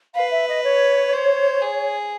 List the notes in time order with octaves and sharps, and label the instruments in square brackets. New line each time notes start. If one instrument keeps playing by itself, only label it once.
[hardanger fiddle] B4 [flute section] F5
[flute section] E5
D#5
C#5
[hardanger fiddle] C5
G#4